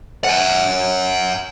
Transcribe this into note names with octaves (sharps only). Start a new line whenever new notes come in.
F#5 G#5